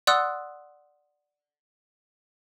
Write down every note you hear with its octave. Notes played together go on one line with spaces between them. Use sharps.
D5 F#5 C6 D#6 E6 F#6